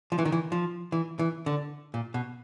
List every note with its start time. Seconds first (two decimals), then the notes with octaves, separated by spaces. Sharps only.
0.12 F3
0.19 E3
0.25 D#3
0.32 E3
0.52 F3
0.92 E3
1.19 E3
1.46 D3
1.94 A#2
2.14 B2